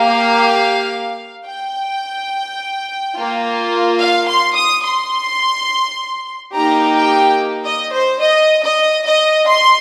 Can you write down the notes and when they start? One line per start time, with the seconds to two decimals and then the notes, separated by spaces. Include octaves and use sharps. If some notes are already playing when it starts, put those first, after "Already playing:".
Already playing: A#3 G4 F5
1.47 G5
3.16 A#3 F4
4.00 F5
4.29 C6
4.56 D#6
4.84 C6
6.53 A#3 D#4 G4 A#5
6.95 G5
7.66 D#5
7.94 C5
8.22 D#5
8.64 D#5
9.06 D#5
9.48 C6